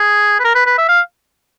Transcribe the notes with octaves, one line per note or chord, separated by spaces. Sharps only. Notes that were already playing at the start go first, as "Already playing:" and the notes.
Already playing: G#4
B4
A#4
B4
B4
E5
F5